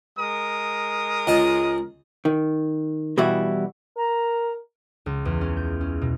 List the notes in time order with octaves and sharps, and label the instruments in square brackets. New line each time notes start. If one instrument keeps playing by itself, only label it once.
[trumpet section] G#3 A#4 D#6
[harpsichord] C#2 D#5 A5
[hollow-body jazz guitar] D#3
B2 E3 G3 E4 F#4
[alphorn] A#4 [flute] A#5
[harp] C#2
E2
C#4
G6
C#4
B2